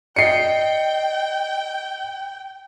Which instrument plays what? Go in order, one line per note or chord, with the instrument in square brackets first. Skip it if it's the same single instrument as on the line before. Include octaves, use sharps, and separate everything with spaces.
[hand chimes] D5 D#5 [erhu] G5 [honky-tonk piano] C7 C#7